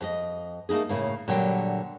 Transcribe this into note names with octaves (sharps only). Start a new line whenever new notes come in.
F2 G4 D#5
A3 A#3 D4 D#4 G#4
A2 C#3 A#3
A#2 D3 F#3 G3 G5